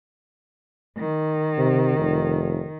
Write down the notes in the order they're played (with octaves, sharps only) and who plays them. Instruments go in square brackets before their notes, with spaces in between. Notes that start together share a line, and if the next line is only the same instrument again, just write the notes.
[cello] D#3
[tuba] C3
F1